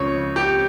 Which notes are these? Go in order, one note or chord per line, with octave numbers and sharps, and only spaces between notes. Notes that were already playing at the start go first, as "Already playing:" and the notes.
Already playing: C#2 C#3 F3 C#5
G4